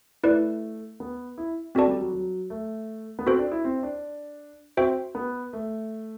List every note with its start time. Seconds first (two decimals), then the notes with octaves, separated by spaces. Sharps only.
0.24 A3 E4 B4 D5
1.00 B3
1.38 E4
1.75 C4 D4 F#4 A4 D5 A5
1.88 G3
2.01 F#3
2.13 F#3
2.50 A3
3.19 B3
3.26 C4 F#4 A4 C5
3.39 D4
3.51 E4
3.64 C4
3.83 D4
4.77 C4 F#4 C5 E5 G5
5.15 B3
5.53 A3